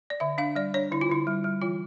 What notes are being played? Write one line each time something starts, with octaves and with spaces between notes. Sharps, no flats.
D5
D3 E5
D4 F5
G3 D5
D4 C#5
D3 E4
F4
D3 E4
G3
G3
E3 F4